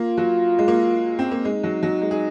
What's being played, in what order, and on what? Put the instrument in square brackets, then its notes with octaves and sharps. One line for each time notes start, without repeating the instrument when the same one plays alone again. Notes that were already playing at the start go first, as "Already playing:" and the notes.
Already playing: [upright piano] A#3 [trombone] F4
[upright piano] F#3
G#3
A#3
C4
A#3
[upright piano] G#3 [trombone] D#4
[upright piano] F#3
F#3
G#3
G#4